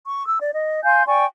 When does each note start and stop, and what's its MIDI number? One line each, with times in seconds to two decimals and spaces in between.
0.07 0.26 85
0.27 0.39 88
0.39 0.51 74
0.54 0.82 75
0.84 1.03 77
0.84 1.03 80
0.84 1.03 84
0.84 1.03 91
1.07 1.24 74
1.07 1.24 79
1.07 1.24 80
1.07 1.24 85